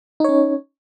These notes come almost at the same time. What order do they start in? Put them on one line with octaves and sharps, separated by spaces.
D#4 C#5 C#4